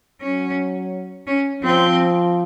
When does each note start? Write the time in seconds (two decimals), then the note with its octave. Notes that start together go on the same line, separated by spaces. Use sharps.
0.21 F#3 C#4
1.27 C#4
1.62 F3 C4